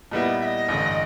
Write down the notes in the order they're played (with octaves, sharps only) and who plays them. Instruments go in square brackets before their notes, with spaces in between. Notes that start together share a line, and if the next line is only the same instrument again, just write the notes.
[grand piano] A#2 G3 B3 E4 [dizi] D#5
[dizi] E5
D#5
[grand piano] A1 G2 D3